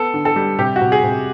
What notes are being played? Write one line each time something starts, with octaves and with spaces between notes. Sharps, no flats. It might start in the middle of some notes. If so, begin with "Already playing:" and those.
Already playing: B3 A4
D3
A4
G3
C3 G4
F#4
C3
G#4
C3